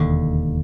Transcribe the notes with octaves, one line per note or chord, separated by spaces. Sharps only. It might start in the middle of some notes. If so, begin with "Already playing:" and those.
Already playing: E1 D#2 D3